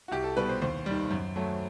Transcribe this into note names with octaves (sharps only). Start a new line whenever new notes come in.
F#4
C2 G4
A4
B2 G3 B3 B4
C5
D#2 C5
D#3 G3
F#2
F#3 A3